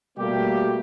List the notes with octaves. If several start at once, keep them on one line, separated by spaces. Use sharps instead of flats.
B2 G3 A3 A#3 G4